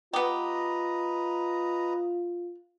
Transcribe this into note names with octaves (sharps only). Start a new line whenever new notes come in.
B3 F4 G4 B4 D#5 A#5